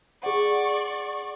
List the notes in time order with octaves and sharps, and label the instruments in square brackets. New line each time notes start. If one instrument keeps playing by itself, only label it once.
[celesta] G#4 F#5 [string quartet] D5 C#6